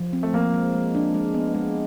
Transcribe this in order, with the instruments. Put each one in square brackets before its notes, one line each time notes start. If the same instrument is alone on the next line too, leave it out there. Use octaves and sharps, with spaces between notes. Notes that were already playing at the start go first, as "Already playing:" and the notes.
Already playing: [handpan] F3
C4
[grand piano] A3
[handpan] F3 [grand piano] A#3
[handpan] G#3
G#3
D4
G#3
B3
G#3